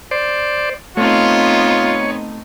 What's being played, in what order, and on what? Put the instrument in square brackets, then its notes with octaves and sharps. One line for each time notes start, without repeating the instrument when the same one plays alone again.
[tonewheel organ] C5 D5
[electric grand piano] A3 [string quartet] B3 C4 D#4 [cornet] F4 [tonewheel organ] C#5